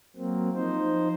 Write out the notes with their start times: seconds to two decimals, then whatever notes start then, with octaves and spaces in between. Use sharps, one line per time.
0.16 F#3 A#3 C4
0.55 F3 D#4 C5